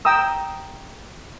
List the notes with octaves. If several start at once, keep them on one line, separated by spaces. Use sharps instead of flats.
G5 A#5 D#6 E6